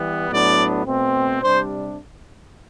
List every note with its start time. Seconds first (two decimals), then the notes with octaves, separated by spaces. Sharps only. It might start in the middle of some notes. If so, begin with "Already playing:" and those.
Already playing: E3 G3 B3
0.30 A2 F#3 B3 D4 D5
0.86 B2 A3 C4
1.41 C3 G3 D4 C5